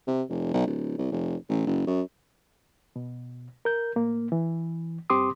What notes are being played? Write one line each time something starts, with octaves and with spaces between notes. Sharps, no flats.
C3
F1
B1
D1
C2
F1
A1
F#1
F#2
B2
A#4 G6
A2 A#3
E3
G2 C4 G4 C6 D6 D#6